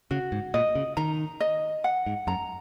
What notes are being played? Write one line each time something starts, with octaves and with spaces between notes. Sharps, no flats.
C#3 F#4
G#2
A#2 D#5
C#3
D#3 A#5
D#5
F#5
G#2
F#2 A#5